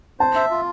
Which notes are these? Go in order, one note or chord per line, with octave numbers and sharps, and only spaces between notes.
C5 A5
E5
F4